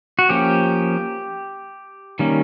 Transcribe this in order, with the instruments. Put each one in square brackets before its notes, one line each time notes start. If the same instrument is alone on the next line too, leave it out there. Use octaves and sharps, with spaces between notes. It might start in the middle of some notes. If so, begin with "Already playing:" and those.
[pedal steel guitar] F#4
F3 A#3 C#4 G4
D#3 G3 A#3 C#4